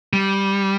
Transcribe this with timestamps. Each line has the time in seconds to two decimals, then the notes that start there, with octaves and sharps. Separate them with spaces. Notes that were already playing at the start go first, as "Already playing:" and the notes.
0.13 G3